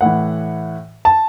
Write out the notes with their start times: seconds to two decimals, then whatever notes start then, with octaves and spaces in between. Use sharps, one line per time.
0.01 A2 E3 F#5
1.05 A5